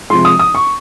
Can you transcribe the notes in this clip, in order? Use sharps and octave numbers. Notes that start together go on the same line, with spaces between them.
C3 F3 G#3 C6
D#6
D#6
C#6